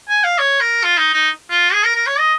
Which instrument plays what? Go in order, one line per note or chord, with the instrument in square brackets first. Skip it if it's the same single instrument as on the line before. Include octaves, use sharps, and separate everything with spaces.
[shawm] G#5
F5
C#5
A#4
F4
D#4
D#4
F4
G#4
A#4
A#4
C#5
D#5